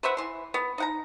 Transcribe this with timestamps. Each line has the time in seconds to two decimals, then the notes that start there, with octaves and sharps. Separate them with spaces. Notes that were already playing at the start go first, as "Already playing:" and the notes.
0.03 B4 C5 E5 F#5
0.17 E3 C6
0.54 B3
0.78 D#4 F#5 A#5